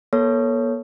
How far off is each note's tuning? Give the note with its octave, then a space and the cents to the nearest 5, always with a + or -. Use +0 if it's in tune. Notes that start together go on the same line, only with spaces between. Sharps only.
A#3 +45 A4 +0 C#5 +5